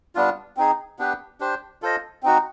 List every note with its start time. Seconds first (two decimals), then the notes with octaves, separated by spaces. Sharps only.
0.15 G3 B3 D4 F4
0.57 C4 D#4 G#4
0.99 B3 D4 G4 B4
1.40 D4 G4 C5
1.82 F4 A4 C5 D#5
2.23 C4 D#4 F#4